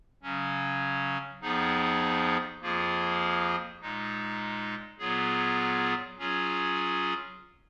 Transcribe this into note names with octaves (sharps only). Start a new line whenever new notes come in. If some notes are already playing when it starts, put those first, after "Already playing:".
C#3 F#3 C#4
F2 F3 B3 D#4 G#4
F2 F3 A#3 F4 G#4
A#2 G#3 D#4
A#2 F#3 B3 F4 G#4
F#3 C#4 F4 G#4